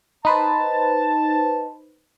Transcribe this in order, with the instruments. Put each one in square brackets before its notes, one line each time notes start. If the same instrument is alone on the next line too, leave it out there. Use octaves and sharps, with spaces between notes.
[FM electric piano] D#4 B4 C5 [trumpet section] A5